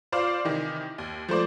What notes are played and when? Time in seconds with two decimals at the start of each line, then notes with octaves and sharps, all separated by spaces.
0.12 F4 C5 D5 F5
0.45 C3 D#3 E3
0.98 D#2
1.28 F3 A3 C5 D5